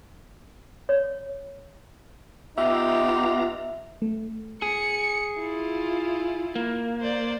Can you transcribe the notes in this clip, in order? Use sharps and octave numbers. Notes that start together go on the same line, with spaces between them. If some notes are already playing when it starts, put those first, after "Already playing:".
C#5
B3 D#4 F4 G4 E5 A#5
A3
G#4 C#7
E4 F4
A#3
C5 D5